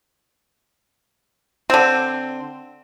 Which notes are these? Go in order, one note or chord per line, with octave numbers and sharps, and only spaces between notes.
D3 C4